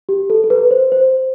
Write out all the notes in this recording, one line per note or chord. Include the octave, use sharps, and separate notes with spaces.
G4
A4
A4
B4
C5
C5